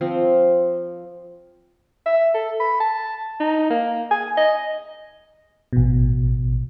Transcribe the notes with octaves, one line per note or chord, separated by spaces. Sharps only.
F3 C4
E5
A4
B5
A5
D#4
A#3
G#5
D#5
A1 B2